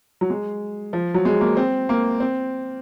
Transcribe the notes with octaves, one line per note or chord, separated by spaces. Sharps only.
F#3
G#3
F3
F#3
G#3
A#3
C4
A#3
C4